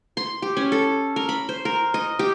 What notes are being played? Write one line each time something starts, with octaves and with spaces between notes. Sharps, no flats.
C6
G4
C#4
A4
A#4
B5
C5
A#4
D#5
G4